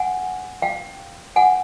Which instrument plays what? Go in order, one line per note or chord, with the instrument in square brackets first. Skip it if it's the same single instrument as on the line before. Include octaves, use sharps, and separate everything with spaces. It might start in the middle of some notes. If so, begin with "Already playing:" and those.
Already playing: [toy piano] F#5 G#5
F5 G5
F#5 G#5